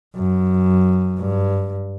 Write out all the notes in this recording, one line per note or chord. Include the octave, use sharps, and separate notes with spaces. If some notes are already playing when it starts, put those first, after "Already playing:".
F#2
G2